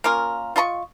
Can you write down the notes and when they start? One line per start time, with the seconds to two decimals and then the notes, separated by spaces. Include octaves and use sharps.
0.04 A#3 C#4 F4 A#4
0.56 F4 D#5 A#5 C#6